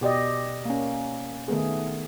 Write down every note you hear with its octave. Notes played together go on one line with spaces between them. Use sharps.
B2 G4 D5 D#5
A#3 C#4
D#3 A3 B3 G#4